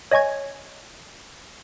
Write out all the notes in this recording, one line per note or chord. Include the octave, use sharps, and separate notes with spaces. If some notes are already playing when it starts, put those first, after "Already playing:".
C#5 D#5 G#5 C#6 G#6